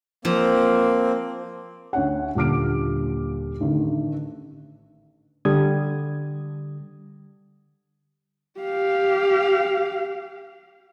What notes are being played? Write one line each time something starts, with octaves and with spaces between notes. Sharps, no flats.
F3 A#3 C4
D2 C#4 F#5
D#1 A#2 D3 D6 F6 D7
A1 D3 D#3
D3 G3 D#6 G#6
G4 F5